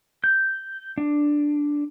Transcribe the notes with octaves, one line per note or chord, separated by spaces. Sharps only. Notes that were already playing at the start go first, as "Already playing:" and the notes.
G6
D4